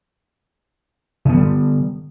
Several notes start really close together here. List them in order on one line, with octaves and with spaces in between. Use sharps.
D3 B3 F3 G3